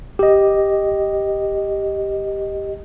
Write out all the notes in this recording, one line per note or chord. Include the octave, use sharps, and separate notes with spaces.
G4 D#5